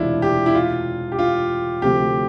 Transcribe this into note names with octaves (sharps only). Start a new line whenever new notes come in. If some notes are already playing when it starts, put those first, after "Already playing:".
Already playing: E1 D2 C3 E3 D4 E4 F4
G4
E4
F4
G4
F4
D2 C3 F3 A3 G4